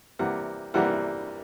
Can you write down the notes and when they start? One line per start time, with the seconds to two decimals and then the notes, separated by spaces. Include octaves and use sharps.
0.19 C3 E3 G3 A#3 F#5
0.74 C3 E3 G3 A#3 F#5